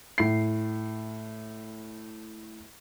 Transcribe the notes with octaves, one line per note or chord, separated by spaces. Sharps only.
A2 C7